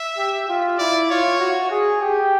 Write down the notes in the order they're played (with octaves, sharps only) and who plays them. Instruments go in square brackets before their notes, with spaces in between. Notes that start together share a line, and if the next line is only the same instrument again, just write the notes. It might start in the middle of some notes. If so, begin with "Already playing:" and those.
Already playing: [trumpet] E5
[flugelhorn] G4
F4
[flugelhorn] E4 [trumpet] D5
[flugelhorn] F4 [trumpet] C#5
[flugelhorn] F#4
G#4
G4